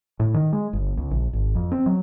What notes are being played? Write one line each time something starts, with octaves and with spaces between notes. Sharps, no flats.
A2
D#3
G#3
G1
C#2
A#1
G#1
F2
C4
F#3